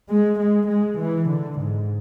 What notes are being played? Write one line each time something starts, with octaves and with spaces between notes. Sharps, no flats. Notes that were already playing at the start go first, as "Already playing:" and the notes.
G#3
G#3
G#3
E3
D3
G#2